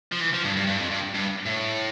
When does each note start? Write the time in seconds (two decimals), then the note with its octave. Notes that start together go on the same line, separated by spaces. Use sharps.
0.12 F3
0.21 E3
0.33 F3
0.44 G2
0.57 G2
0.67 G2
0.79 F2
0.91 G2
1.14 G2
1.46 A2